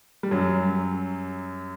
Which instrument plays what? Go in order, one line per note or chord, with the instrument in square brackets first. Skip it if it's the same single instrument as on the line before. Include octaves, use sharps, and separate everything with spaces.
[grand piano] G3
F#2 F#3